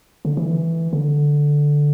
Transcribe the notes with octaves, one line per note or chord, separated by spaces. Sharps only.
D3
E3
D3